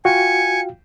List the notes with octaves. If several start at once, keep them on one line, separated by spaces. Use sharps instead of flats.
F4 F#4 F5 G5 G#5 C#7